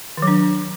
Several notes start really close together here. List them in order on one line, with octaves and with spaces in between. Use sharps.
D#3 F#3 D4